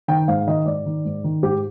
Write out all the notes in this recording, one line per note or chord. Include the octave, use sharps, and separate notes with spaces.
D#3 G5
G#2 F5
D#3 D#5
G#2 D5
D#3
G#2
D#3
G#2 G4